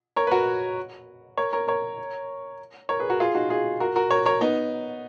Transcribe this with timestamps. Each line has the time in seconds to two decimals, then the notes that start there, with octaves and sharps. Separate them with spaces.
0.16 A#4 C#5
0.27 B4
0.31 F#4 A#4
1.37 A#4 C#5
1.53 A#4 C#5
1.68 A#4 C#5
2.89 A#4 C#5
3.00 G#4 B4
3.09 F#4 A#4
3.20 F4 G#4
3.35 D#4 F#4
3.50 F4 G#4
3.80 F#4 A#4
3.96 F#4 A#4
4.11 A#4 C#5
4.26 A#4 C#5
4.41 B3 D#4